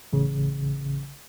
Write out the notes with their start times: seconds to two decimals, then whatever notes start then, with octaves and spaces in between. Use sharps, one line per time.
0.13 A1 C#3